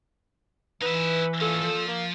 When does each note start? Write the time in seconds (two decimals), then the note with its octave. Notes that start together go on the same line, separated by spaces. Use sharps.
0.82 E3 D#4 B4 E5
1.41 A#2 A3 C#4 F4 A4
1.62 F3
1.88 A#3